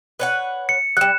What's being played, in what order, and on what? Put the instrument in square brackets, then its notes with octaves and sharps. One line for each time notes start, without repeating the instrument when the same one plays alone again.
[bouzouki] B4 C#5 F#5
[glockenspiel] C#7
[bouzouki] F#3 G3 [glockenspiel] F#6 E7